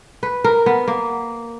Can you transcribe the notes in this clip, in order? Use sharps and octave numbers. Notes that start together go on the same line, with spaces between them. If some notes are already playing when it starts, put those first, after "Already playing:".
B4
A#4
B3
A#3